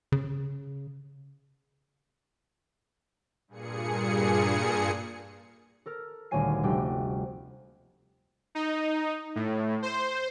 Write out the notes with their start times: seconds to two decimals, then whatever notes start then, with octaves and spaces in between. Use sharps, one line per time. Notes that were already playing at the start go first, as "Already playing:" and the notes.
0.12 C#3
3.48 G2 A#2 G#4 C#7
5.86 A4 A#4 F6
6.31 D#1 D2 A#3 C#5 G#5 C7
6.63 F1 G3 D4 G4 G5
8.55 D#4
9.35 A2
9.82 C5